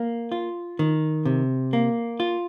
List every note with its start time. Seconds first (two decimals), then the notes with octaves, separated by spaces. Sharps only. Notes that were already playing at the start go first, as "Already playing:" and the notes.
Already playing: A#3
0.32 F4
0.79 D#3
1.25 C3
1.73 A#3
2.20 F4